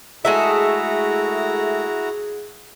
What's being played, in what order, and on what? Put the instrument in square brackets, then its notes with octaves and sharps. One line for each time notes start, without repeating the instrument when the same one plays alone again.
[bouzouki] G#3 A3 E5 [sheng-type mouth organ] E4 F#4 A#5 [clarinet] G#4